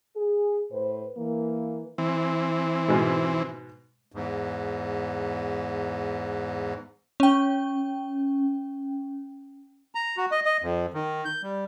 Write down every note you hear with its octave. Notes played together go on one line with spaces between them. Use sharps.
G#4
A2 B4 C5
E3 A#3
E3 C4
G#2 B2 G#3
E2 G#2
C#4 G5
A#5
F#4
D#5
D#5
F2
D#3
G6
G3